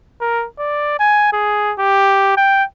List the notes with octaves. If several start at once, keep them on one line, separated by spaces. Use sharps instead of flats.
A#4
D5
G#5
G#4
G4
G5